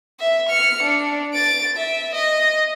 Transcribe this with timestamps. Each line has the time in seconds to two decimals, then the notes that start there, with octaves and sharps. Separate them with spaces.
0.20 E5
0.50 F6 C#7
0.83 D4
1.34 A6 D7
1.77 E5
2.15 D#5